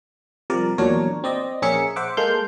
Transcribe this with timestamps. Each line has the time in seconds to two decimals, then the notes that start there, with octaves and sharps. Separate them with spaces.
0.50 C3 F3 G3 A#4 D5
0.78 E2 A#2 F#3 D4 A#4 C#5
1.24 C4 D5 D#5
1.62 A#1 C#4 G#4 A#4 E5 C#7
1.96 C5 E5 F#5 D6
2.17 G#3 A#3 A4 C6 F6 G6